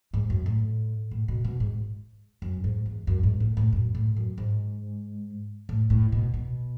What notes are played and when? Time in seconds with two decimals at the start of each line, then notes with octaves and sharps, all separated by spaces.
0.14 G#2
0.30 F#2
0.46 A2
1.11 A2
1.28 B2
1.44 B2
1.60 G#2
2.42 F#2
2.64 G#2
2.86 E2
3.07 F#2
3.23 G#2
3.40 A2
3.57 A2
3.73 F#2
3.95 A2
4.16 F#2
4.38 G#2
5.69 A2
5.90 A2
6.12 B2
6.34 B2